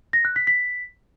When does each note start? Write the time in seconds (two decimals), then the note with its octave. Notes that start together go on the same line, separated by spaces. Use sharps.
0.13 A#6
0.25 F#6
0.36 B6
0.47 B6